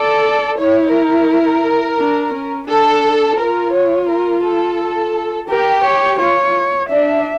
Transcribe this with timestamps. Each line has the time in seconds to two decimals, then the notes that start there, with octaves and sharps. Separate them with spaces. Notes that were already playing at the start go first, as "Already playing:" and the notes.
Already playing: A4 D5
0.58 E4 C#5
0.93 A#4
1.98 D4
2.34 C#4
2.69 D4 A4
3.39 F4 A#4
3.73 C#5
4.09 A#4
4.44 A4
5.50 G4 A#4
5.85 C#5
6.19 F4 C#5
6.90 D4 E5